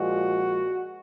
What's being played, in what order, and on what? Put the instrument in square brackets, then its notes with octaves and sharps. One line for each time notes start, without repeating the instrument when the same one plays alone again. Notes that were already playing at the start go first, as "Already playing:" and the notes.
Already playing: [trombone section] A#2 F3 G#3 F#4